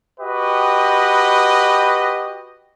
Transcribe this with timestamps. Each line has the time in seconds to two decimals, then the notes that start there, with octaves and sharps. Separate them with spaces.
0.21 F#4 G4 B4 D#5